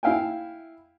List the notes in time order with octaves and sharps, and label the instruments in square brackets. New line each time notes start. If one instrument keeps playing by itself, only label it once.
[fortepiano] E4 E5 F5 G5 G#5